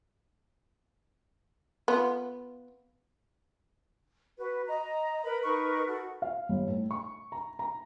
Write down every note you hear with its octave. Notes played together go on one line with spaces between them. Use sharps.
B3 F4
F#4 B4
D#5 A#5
A#4 B4 B5
D#4 A#4 B4 C#6
F#4 A4
F5
G1
A2
C#6
A#5
A#5